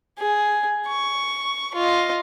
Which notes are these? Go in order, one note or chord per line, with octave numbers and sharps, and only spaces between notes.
G#4
C#6
F4 D#5